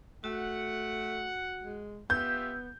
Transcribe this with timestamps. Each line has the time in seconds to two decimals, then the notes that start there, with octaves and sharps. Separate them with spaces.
0.24 A3 F#4 F#5
1.63 G#3
2.10 B3 F4 G4 E5 E6 G6